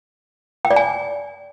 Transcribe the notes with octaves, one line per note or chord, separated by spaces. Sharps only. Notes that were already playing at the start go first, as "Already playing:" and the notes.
G5
D5
G#5